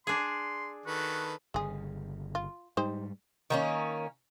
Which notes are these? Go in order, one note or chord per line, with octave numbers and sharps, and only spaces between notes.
D4 G#4 C6
D#3 F#4 A4 B4
G1 C#3 G#3 G#4
F4
G#2 G3 D#4 G4 C5
D#3 A#3 C#4